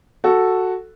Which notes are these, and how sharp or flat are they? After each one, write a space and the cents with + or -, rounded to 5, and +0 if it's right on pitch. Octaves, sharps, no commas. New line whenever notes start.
F#4 +0 A4 +0